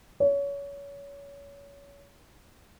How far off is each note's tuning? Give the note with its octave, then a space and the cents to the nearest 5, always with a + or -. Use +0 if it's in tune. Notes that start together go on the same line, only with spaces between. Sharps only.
C#5 +25